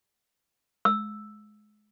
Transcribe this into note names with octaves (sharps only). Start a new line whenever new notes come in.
E6